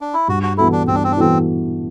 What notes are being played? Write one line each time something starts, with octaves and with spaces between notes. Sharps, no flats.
D4
E4
G2 F#4
F#4
E3 B3 E4 F#4 A4
D4
G2 C4
D4
C4
D4
E3 B3 C4 F#4 A4